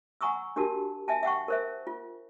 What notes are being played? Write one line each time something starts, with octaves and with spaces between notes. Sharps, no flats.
F#5 G#5 A#5 C#6 D#6 E6
D4 F#4 G4 A#4 A5
E5 G#5 A5
E5 F#5 G5 C#6
A#4 C5 E5
F4